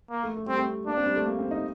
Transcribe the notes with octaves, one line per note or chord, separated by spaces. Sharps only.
A#3
A3
A3
G3 C4
A3
A#3 D4
C4
G3
A3
A#3
C4
D#4